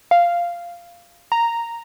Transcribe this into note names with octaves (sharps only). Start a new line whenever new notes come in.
F5
A#5